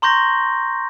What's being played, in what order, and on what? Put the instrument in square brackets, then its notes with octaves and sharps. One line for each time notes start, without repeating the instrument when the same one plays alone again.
[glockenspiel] A#5 C6 C#6 G6 A#6